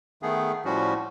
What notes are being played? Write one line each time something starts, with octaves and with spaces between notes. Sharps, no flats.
D#3 A3 B3 G#4
A2 F3 G3 C#4 F#4